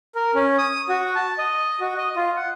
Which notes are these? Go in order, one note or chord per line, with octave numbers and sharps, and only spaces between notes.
A#4
C#4
D#6
F#4
A5
D#5
F#4
D#5
F4
F#5